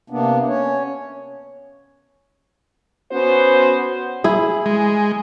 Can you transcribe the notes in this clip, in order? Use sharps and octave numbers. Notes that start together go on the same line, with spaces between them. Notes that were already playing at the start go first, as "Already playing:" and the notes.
C3 A#3 B3 D4
C#4 C#5
B3 C#4 F#4 C5
E4 G#4
G#3